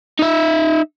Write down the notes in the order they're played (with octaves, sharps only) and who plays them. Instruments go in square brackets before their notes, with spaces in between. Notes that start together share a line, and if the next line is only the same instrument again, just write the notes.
[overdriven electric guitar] D#4 E5